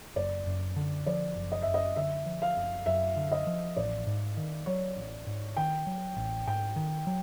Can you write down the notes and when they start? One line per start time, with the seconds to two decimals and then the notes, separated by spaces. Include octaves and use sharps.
0.16 F#1 D5
0.47 F#2
0.76 D3
1.06 F3 D5
1.36 F#1
1.52 D#5
1.62 F#2 E5
1.74 D#5
1.96 D3 E5
2.26 F3
2.42 F5
2.57 F#1
2.86 F#2 E5
3.17 D3
3.32 D#5
3.47 F3
3.77 A1 D5
4.07 G#2
4.37 D#3
4.66 F#3 C#5
4.97 A1
5.27 G#2
5.57 D#3 G5
5.87 F#3
6.17 A1
6.47 G#2 G5
6.76 D#3
7.07 F#3